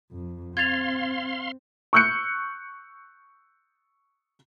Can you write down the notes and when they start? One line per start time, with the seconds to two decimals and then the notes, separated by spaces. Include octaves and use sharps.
0.12 F2
0.57 C4 F5 C6 G#6 A6 F7
1.93 C#6 E6 F#6 G6 C#7